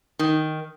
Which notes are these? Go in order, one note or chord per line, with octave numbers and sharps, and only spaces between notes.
D#3